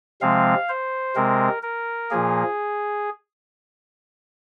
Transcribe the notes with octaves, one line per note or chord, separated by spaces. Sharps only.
C3 F3 G#3 C4 F5
C5
C3 G#3 C4 A#4
A#4
A#2 F3 A#3 G#4